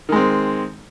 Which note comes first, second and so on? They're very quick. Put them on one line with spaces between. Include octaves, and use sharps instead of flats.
D#3 G#3 C4